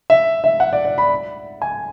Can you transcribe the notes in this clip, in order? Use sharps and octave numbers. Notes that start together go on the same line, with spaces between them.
E5
E5
F#5
D5
D5
B5
G#5